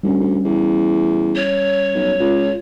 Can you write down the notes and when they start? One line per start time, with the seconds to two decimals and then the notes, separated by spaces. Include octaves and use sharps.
0.03 D2 G3 C#4
0.20 D2
0.45 E2
1.35 C#5
1.95 B1
2.20 C#2 F4